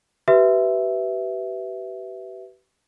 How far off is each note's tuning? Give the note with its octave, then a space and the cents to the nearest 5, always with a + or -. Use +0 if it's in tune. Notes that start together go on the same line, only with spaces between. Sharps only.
G4 -40 B4 +0 E5 +0